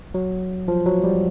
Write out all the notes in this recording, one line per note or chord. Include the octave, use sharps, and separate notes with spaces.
F#3
F3
F#3
G3